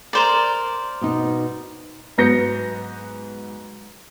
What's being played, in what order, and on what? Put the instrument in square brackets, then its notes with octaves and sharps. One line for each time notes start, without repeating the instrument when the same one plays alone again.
[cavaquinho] A#4 C5 D5
[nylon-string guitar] B2 D#4
[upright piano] G#2 F#3 B3 G6 A#6 C#7